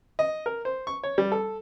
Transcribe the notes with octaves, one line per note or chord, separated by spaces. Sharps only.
D#5
A#4
C5
C#6
C#5
G3
A4